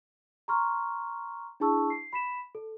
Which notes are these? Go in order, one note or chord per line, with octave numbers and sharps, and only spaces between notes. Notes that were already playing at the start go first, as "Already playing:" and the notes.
A#5 C6 C#6 F6
D4 E4 G#4 A5 C#6 E6
C7
B5 B6 E7
A4